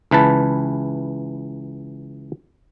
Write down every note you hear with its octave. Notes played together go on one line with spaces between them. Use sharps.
C#2 E3 B4 A5